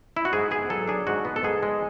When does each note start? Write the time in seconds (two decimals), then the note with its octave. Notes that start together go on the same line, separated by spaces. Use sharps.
0.17 E4
0.25 F#4
0.33 G#2 G#4
0.51 B3 G#4
0.70 F#3 A4
0.88 D4 G#4
1.07 G#2 F#4
1.25 B3
1.36 A4
1.43 G#2 G#4
1.63 G#3